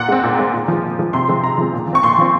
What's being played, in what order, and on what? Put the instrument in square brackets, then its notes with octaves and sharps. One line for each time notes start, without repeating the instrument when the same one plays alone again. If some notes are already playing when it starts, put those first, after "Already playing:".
Already playing: [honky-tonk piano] A#2 F#5
G#3 C4
A#2
G#3 C4
A#2
F3 G#3
A#2
F3 G#3
C3 C6
F3 G#3 C4
C3 A#5
F3 G#3 C4
A#2
F3
C4 C#6
A#2 C6
F3 C4